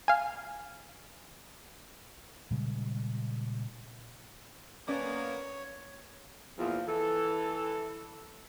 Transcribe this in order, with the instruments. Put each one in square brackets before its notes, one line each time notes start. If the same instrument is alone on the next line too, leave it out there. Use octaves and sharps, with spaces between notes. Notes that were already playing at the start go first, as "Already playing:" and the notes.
[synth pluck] F5 G#5
[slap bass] A#2 C#3 G3 G#3
[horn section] A#3 B3 [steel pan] C#4 D5 D6 [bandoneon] C#5
[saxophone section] E2 A#2 F3
E3 A4